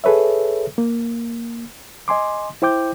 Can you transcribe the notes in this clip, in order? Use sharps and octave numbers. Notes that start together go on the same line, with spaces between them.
G#4 A4 B4 C#5 E5
A#3
D#5 G#5 C6 D6
E4 C5 G5 D6 G6